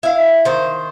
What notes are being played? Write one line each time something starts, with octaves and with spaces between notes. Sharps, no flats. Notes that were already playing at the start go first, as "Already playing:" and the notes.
E4 F5
D#3 C5